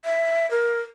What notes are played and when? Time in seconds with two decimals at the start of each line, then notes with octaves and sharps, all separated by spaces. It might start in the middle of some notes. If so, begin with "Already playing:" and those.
0.05 E5
0.51 A#4